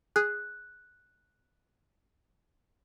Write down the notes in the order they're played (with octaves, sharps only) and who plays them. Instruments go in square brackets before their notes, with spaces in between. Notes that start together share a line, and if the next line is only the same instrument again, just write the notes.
[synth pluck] G#4 [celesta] F#6